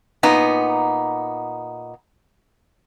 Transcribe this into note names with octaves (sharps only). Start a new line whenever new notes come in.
A#2 B3 D#4